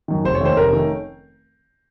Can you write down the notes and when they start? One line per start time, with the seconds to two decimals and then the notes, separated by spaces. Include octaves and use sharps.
0.08 F#2 D#3
0.25 F1 C5
0.35 C#5
0.41 D#2 D#3 A3 C#4 C5
0.57 F1 A#4
0.73 D#3 A3 C#4